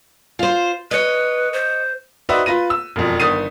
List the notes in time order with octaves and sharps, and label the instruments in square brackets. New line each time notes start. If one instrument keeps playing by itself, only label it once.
[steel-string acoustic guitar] F4 C5
[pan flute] B4 [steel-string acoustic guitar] C#5 D#5
[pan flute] C5
[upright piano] D#4 F#4 B4 C5 D5 E5
F4 B4 A#6 D#7
E6
E1 F2
G1 D#3 D#6 A6 C7 D#7